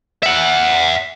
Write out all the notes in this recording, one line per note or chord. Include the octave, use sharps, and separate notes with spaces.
E5 F#5